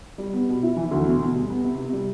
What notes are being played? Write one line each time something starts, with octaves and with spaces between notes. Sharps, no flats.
G3
B3
B2
E4
E3
D2
B2
B2
G3
B3
C3
C3
G3